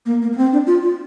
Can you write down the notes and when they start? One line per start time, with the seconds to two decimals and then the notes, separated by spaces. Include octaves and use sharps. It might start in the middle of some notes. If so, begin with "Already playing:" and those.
0.06 A#3
0.22 A#3
0.33 A#3
0.37 C4
0.52 D4
0.67 F4
0.82 F4